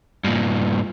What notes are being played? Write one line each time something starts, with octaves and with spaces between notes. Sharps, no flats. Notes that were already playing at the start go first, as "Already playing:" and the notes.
G2 A#2